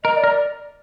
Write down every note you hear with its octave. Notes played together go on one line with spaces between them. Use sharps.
A#4 D#5
D5
A#4
D5